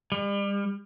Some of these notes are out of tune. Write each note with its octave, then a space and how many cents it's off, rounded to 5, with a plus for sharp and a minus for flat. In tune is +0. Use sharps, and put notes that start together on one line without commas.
G3 +40